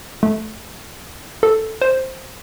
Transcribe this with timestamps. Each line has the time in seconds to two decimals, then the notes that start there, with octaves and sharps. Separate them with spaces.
0.23 A3
1.43 A4
1.82 C5